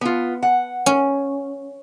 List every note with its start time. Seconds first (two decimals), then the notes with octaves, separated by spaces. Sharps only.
0.01 B3 F4
0.43 F#5
0.86 C#4